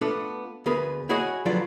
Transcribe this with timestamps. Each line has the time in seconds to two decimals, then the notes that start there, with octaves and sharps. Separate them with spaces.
0.01 A3 B3 D4 F4 A4 B4
0.66 D2 B3 G#4 A#4 B4 B5
1.09 E4 F#4 G#4 C#5 D#5 F#5
1.45 D3 F3 F#3 F4 B4 D5